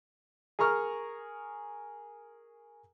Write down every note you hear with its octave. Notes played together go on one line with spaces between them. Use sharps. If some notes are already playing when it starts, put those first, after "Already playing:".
G#4 A#4 A#5 C#6 F6